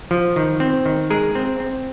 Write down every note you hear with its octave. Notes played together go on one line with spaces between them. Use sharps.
F3
D#3
C4
D#3
G#3 G#4 A#4
C4
C4